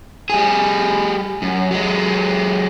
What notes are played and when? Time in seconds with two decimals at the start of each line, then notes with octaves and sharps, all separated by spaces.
0.30 G3 G#4
1.42 F#2
1.71 F#3 G#3